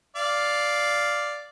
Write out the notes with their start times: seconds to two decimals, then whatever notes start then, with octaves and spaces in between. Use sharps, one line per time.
0.16 D5 F5